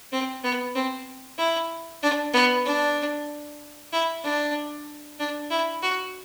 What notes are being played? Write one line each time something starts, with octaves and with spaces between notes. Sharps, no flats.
C4
B3
C4
E4
D4
B3
D4
E4
D4
D4
E4
F#4